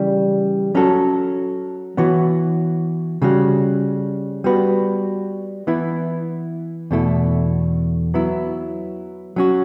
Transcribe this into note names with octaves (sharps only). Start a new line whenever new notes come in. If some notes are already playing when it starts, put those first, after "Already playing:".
Already playing: C#3 E3 G3
F#3 C#4 F#4 A4
E3 B3 F#4 C#5
C#3 G3 C#4 F#4
G3 B3 F#4 B4
E3 B3 E4
E2 B2 A3 E4
F#3 B3 E4
F#3 C#4 F#4